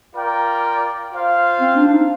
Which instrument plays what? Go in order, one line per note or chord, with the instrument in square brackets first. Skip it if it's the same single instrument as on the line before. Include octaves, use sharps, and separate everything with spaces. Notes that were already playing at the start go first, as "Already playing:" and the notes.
[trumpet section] F4 A#4 D5 G5
F4 C5 F5
[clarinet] C4
D4
D4
D#4